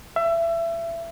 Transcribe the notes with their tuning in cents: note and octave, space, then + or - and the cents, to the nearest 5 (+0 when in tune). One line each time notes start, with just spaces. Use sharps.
E5 +25